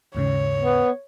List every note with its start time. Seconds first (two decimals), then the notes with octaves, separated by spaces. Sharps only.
0.15 D#2 G#2 C#3 C#5
0.60 B3